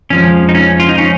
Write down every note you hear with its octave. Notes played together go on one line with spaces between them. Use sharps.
F2 F3 G#3 C#4
D#4
C#4
F4
D#4
C#4